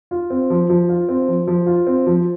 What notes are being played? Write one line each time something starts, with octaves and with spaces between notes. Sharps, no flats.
F4
C4
F3
F3
F4
C4
F3
F3
F4
C4
F3